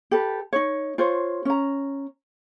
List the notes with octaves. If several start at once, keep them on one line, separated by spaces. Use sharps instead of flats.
G4 A4 B4
D#4 C#5
F4 C5 C#5
C#4 A#5